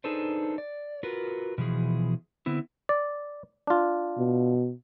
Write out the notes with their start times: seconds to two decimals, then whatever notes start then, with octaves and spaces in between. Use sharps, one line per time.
0.04 D4 D#4 G#4 A4 B4 C5
0.58 D5
1.03 F4 F#4 A#4 B4
1.58 B2 E3 F3 G#4
2.46 D3 B3 C4 E4
2.89 D5
3.67 D4 F4
4.18 B2